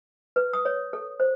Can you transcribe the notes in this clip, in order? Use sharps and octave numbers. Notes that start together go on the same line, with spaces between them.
B4
D#6
C#5
A4
C5